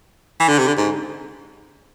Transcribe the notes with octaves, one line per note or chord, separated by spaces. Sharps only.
E3
D3
C3
D3
G#2